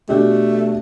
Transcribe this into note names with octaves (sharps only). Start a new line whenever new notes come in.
B2 A3 D4 G4